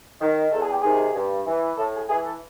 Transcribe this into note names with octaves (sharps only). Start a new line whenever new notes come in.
D#3
E2 A4
G#4
G4
C3 D#3 G#4
G2
E3
A2 A4
G#4
E3 G#4
A4